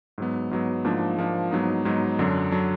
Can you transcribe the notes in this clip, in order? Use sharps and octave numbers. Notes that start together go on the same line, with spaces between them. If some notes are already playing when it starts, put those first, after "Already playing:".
G#2 F#3 B3
G#2 F#3 B3
G#2 F3 A#3 D4
G#2 F3 A#3 D4
G#2 F#3 B3 D#4
G#2 F#3 B3 D#4
F#2 D3 F#3 D4
D3 F#3 D4